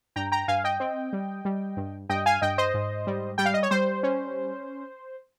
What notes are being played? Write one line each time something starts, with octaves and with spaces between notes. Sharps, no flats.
G2 G5 A#5
G5 A#5
G2 F5 G#5
D#5 G5
C4
G3
G3
G2
G2 D#5 G5
F5 G#5
G2 D#5 G5
C5 D#5
G#2
G3
G3 G5
F5
D#5
C#5
G3 C5
C#4